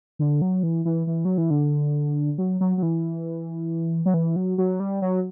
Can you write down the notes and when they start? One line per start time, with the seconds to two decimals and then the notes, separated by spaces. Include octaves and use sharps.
0.19 D3
0.42 F#3
0.63 E3
0.85 E3
1.07 E3
1.25 F#3
1.38 E3
1.51 D3
2.38 F#3
2.61 F#3
2.77 F#3
2.83 E3
4.06 F#3
4.14 E3
4.36 F#3
4.58 F#3
4.80 G3
5.02 F#3